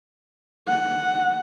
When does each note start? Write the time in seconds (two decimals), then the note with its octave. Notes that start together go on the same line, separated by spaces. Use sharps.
0.68 F#5